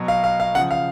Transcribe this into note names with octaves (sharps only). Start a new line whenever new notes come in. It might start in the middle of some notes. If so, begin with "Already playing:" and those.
Already playing: B2 F#3
F5
F5
F5
C#3 F3 F#5
F5